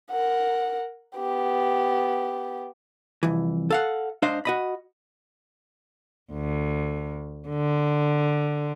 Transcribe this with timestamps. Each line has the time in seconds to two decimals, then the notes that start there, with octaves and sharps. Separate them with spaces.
0.11 A#4 F#5
1.16 B3 G4
3.23 C2 F2 E3
3.70 A4 F5 F#5
4.22 G#2 D4 C5 D#5 F5
4.45 F#4 D#5 B5
6.33 D2
7.48 D3